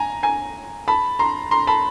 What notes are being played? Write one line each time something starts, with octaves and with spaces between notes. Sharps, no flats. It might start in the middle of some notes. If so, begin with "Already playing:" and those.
Already playing: G#5 A#5
G#5 A#5
A5 B5
A#5 C6
A#5 C6
A5 B5